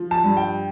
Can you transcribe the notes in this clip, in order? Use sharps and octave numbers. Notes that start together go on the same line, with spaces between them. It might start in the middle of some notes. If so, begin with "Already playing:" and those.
Already playing: F3
A5
G2
G5